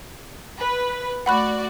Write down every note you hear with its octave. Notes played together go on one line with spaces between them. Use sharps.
B4
A3 F#4 D5 F#5 B5 F#6